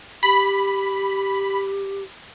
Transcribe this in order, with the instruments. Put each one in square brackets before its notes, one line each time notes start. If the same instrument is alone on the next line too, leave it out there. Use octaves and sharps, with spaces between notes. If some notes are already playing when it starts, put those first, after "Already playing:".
[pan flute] G4 [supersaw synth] B5